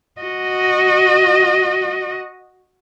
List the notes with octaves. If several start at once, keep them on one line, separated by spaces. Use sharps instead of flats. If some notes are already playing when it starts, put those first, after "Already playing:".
F#4 D#5